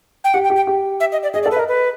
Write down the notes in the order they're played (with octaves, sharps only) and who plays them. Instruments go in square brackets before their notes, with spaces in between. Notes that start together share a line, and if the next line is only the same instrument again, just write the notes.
[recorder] G5
[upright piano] G4 [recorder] F#5
[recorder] G5
[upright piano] G4
[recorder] G5
[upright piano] G4
[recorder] E5
D#5
D5
[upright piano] G#4 [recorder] D#5
[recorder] D5
[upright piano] A4
[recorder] B4
[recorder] A#4 [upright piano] D#5
[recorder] B4